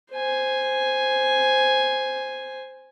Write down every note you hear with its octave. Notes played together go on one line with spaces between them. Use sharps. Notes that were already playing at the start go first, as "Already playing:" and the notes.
C5 G#5